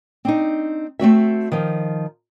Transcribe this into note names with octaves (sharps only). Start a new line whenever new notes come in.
C4 D4 D#4
A3 C4 F#4 E5
D#3 F3